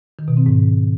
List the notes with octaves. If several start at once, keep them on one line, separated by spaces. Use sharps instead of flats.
D#3
B2
C4
G#2